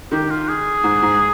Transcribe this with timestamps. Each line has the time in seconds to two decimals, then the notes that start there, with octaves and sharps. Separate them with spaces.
0.12 D#3 G4
0.30 F4
0.48 G#4
0.84 G#2
1.02 G#2